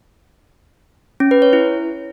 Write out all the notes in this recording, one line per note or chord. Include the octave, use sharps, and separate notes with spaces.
C#4
B4
C#5
E4